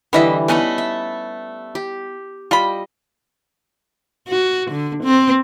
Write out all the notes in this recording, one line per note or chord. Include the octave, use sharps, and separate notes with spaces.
D3 E3 G3 B3 D#5 E5
A3 B3 C#4 D#4 D#5 B5
E5
G4
G3 F4 D#5 B5
F#4
D3
C4